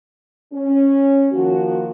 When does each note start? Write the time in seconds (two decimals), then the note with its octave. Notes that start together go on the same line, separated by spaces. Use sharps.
0.53 C#4
1.33 D#3 F3 A#3 F#4